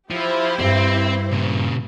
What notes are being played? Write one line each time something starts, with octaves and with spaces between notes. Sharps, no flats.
F3 E4 G4 C5
D2 G2 C4
A#2 C#3